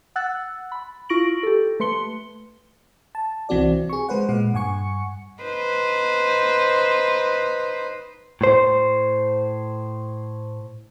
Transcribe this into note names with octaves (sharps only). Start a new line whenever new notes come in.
F#5 E6 F#6 A6
B5
E4 F4 C#6 A#6 D7 F#7
G4 A4
A3 B4 C6 C#7 G7
A5
C2 E3 C4 F#4 D5
G#4 C#6
G#3 B4 C5 F#5
A#2 G#3 F#5
G2 F#5 G#5 C#6 C#7
D#4 B4 C5
A2 C5